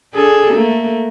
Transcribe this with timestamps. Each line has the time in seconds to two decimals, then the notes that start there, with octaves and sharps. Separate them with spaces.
0.14 D4 G#4 A4
0.53 A3 A#3